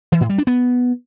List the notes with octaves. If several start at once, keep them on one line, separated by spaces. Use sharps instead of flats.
E3
A2
G3
D4
B3